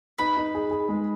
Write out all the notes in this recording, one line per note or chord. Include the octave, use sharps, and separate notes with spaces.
D#4 B4 B5
D#4
G#4
G#4
G#3